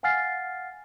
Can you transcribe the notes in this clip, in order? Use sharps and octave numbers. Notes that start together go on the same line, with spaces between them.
F5 F#5 G#5 F6 A6 C7